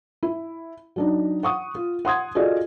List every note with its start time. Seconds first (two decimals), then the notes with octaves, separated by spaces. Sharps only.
0.23 E4
0.96 F#3 D4 D#4
1.43 F#5 C#6 D#6
1.75 F4
2.05 F#5 C6 D#6 G#6
2.35 F4 F#4 G#4 A4 D5 D#5